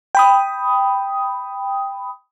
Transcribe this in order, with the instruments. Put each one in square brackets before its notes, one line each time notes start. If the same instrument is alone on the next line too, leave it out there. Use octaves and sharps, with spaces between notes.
[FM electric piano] G5 B5 D#6